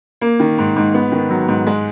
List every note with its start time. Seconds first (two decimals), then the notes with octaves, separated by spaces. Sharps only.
0.21 A#3
0.40 D#3
0.58 G#2
0.76 G#2
0.94 B3
1.12 D#3
1.30 F#3
1.48 G#2
1.67 G#3